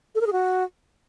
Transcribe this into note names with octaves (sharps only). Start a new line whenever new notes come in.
A4
A#4
G#4
F#4